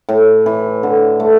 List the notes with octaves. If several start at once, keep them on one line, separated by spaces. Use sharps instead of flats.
A2
E3
D3
A3